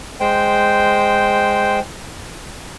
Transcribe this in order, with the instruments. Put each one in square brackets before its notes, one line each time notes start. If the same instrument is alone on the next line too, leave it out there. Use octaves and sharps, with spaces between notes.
[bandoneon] G#3 C5 G5